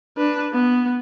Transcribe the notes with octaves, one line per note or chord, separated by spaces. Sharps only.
D4 B4
B3